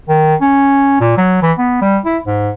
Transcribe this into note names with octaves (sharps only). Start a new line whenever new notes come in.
D#3
C#4
A#2
F#3
E3
B3
G3
E4
G#2